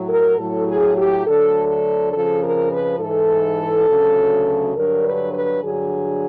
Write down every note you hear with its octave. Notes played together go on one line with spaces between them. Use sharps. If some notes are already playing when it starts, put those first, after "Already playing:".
Already playing: A2 F#3
A#4
A2 F#3 A4
G#4
G4
D2 D3 F#3 A4
A4
F2 C#3 F3 A4
A#4
B4
G#2 E3 A4
D2 C#3 F#3
G2 D3 F#3 A#4
B4
B4
G2 D3 F#3 G#4